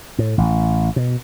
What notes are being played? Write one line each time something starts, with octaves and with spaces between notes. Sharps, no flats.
A2
A1
B2